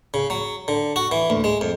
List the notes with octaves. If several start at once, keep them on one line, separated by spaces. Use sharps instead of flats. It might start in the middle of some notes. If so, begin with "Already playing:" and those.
C#3
F#3
D3
F#4
E3
D2
G#3
F2